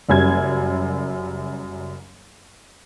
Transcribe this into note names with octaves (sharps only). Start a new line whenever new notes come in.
F#1 F#2 G3 G#6